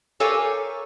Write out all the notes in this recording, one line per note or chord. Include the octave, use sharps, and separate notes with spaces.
G4 A4 A#4 C#5 F5 G#5